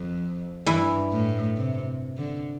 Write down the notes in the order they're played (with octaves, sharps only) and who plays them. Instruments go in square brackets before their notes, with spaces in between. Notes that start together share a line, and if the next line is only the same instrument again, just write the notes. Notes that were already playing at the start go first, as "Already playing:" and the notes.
Already playing: [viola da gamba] F2
[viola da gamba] G2 [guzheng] E3 E4
[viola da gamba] A2
C3
D3